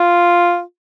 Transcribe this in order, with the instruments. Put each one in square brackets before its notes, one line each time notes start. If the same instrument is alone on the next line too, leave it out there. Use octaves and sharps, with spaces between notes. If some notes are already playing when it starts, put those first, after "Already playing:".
Already playing: [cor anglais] F4